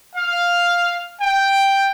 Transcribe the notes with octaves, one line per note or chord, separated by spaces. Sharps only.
F5
G5